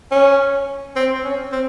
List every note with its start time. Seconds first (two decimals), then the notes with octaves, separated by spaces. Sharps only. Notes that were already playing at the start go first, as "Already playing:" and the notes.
0.11 C#4
0.96 C4
1.24 C#4
1.52 C4